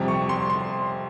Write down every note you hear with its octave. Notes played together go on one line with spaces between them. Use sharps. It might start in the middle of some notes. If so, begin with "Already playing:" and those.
Already playing: F2 C3 G3
C#6
C6
C6